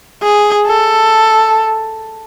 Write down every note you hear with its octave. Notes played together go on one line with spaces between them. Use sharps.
G#4
A4